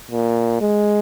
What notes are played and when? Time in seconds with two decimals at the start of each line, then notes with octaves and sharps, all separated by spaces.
0.11 A#2
0.61 G#3